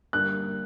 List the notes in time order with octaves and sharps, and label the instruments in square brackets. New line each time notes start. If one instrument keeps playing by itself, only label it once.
[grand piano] D3 G3 A#3 [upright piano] F#6